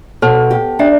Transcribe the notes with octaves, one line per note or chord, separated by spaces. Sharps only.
B2 A4 A5
G4
D4 E5